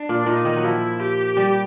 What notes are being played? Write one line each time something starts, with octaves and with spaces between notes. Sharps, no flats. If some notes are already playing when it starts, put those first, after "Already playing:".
Already playing: D4
A#2
A#2 D#4
D#3
F#3
F3 E4
G4
G3